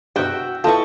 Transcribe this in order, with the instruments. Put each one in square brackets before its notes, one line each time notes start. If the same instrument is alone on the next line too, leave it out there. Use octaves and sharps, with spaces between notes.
[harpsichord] G2 B2 [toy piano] E4 [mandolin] F#4 [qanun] E5 G5
[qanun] E4 D#5 G5 [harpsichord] F4 [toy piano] A4 B4 [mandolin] A5 C#6